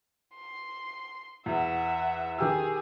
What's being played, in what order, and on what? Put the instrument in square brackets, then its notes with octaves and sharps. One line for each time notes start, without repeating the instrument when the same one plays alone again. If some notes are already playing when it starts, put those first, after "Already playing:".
[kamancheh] C6
[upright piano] E2 [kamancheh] E5 F#5
[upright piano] D#3 G4 E6 [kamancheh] G#4